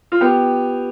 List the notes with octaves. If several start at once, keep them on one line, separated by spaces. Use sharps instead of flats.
F4
B3 G4